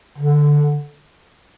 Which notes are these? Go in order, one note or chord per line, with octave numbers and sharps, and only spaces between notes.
D3